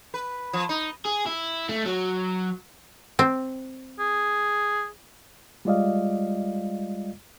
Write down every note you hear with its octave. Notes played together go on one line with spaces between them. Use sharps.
B4
F3
D#4
G#4
E4
A3
F#3
C4
G#4
G3 G#3 F4 D5 D#5 F5